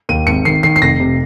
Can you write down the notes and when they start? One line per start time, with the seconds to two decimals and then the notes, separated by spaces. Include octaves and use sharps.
0.09 D#2 D#7
0.27 G#1 C#7
0.45 D#3 C7
0.63 D#3 C7
0.76 C7
0.82 F1 A#6
1.00 C3